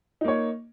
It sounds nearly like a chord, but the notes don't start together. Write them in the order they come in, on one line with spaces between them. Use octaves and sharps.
D#4 A#3 C#5